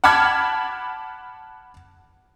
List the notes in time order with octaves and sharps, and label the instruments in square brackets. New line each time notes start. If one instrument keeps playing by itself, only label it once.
[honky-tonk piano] F#5 A5 B5 D6 F6 G#6